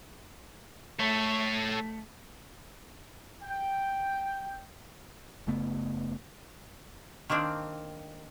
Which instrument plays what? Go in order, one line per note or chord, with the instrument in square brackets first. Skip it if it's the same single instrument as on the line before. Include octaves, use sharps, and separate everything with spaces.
[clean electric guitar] A3 [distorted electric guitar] A4 C#5
[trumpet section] G5
[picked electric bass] F#1 C#3 A3 B3
[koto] D#3 A#3 C4 D4